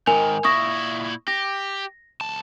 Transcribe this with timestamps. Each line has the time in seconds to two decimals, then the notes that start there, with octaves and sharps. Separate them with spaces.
0.07 G#2 D#3 A#4 G#5 F7
0.44 A#2 E4 C#6 D#6 A#6
1.27 G4 A#6
2.21 C#2 A5